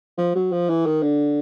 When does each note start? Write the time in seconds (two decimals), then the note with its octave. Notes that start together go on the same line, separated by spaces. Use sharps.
0.18 F3
0.35 F#3
0.52 F3
0.69 E3
0.86 D#3
1.03 D3